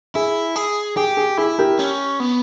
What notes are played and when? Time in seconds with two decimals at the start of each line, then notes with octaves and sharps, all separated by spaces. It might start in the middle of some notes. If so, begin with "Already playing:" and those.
0.15 E4 G#4
0.56 G#4
0.97 G4 G#4
1.17 G#4
1.38 E4 G#4
1.58 G4 A#4
1.79 C#4
2.20 B3